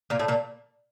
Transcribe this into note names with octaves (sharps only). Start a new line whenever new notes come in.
A#2 A#3
A2 A3
A#2 A#3